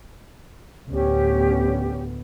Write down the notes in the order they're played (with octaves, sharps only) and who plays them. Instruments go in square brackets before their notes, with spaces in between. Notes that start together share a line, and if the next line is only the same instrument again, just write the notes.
[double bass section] D2 A2 B3 [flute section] C#4 G4